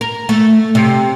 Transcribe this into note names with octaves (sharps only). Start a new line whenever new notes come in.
A#4
A3
C3